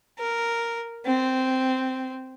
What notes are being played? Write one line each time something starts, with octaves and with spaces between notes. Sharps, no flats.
A#4
C4